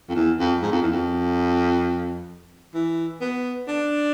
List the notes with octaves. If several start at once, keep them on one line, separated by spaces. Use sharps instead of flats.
F2
E2
F2
G#2
F2
E2
F2
E3
B3
D4